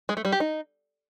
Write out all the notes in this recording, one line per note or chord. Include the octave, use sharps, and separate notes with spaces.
G#3
A3
G3
G4
D#4